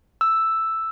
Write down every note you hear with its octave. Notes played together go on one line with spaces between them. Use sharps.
E6